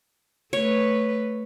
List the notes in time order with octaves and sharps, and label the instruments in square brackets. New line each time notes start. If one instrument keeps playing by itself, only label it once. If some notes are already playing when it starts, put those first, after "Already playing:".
[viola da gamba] A3 B4 [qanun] C#5